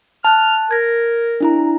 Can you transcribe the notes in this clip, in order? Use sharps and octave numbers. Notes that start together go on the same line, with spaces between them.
A5 F6 F#6
A#4 G#6 A#6
D4 E4 A#5